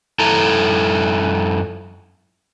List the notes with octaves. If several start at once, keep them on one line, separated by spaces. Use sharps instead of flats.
F#2 E4 A4 A#5